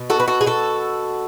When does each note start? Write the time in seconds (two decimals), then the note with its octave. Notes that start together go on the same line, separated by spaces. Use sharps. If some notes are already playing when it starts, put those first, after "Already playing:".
Already playing: B2
0.10 F#4 A4
0.20 B4
0.28 F#4 A4
0.41 G#4
0.46 F#4 A4